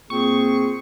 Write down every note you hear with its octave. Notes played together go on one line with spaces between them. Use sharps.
A#2 C4 G#4 C#6